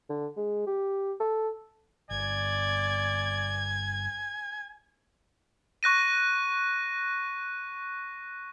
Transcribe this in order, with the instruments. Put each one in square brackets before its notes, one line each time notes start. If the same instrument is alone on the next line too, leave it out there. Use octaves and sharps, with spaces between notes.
[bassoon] D3
G#3
G4
A4
[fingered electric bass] G1 [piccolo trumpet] D5 [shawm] G#5 [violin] G#6
[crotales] C#6 F#6 A#6 D#7